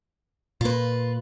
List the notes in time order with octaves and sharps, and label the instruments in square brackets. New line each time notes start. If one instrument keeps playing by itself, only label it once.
[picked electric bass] A#2 A#3 [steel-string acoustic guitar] F4 B4